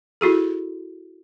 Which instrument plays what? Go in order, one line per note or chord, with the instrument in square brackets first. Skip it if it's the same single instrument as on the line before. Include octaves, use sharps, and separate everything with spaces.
[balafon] E4 F#4 G#4 A4